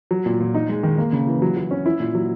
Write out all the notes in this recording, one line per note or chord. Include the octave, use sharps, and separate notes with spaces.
F#3
A#2
A#2
D#4
G#3
D#3
A#3
C#3
E3
F#3
F#3
C#4
E4
A#2
F#3